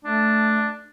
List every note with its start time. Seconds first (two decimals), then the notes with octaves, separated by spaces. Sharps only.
0.05 A3 D4